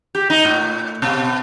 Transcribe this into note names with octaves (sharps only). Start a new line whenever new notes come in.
G4
D#4
A2
B2